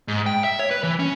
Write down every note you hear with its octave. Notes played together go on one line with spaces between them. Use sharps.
G#2
G5
E5
C#5
B4
E3
C#4